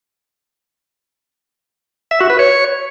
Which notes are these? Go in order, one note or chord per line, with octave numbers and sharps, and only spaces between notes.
E5
F#4
B4
C#5